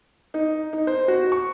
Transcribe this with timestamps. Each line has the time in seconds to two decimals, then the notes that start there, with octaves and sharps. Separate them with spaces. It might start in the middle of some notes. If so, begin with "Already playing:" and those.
0.34 D#4
0.73 D#4
0.87 C5
1.08 F#4
1.32 C#6